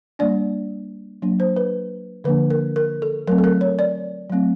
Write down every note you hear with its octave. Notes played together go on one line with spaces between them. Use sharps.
G3 A#3 D4 D5
F#3 A#3 D4
C5
B4
D3 F3 A#3 D4 B4
A#4
A#4
A4
F#3 A3 C4 A#4
A4
A#4
C#5
D5
F#3 A3 C4